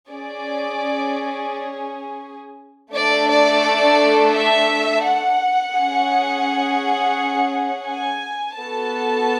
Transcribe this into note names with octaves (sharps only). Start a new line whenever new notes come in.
C#4 G#4 D5
A3 D4 A4 D5
D5
E5
F#5
C#4 G#4
G#5
B3 F#4 A4 A5